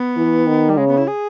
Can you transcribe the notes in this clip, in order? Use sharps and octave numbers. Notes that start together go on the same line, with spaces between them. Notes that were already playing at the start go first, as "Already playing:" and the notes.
Already playing: B3
E3
D#3
G3
C#3 G#3
B3
E4
G#4